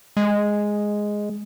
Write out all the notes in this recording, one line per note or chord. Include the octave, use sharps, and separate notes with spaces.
G#3